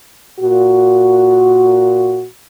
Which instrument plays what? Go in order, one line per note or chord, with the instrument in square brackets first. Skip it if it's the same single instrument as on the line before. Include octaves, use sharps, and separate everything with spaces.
[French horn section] A#2 F#4